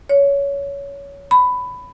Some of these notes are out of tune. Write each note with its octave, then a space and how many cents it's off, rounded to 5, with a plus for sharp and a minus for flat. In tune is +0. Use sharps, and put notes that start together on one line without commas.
C#5 +20
B5 +15